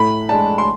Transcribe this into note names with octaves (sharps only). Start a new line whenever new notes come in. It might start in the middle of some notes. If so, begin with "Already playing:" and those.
Already playing: A2 B5
G#3 D4 A5
C6